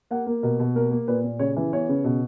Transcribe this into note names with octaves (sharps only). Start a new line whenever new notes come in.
A#3 F#5
A#3
B2 A#4
B2
A#3 A#4
A#3
A#2 B4
A#2
C#3 C#5
E3
B3 C#5
C#3
B2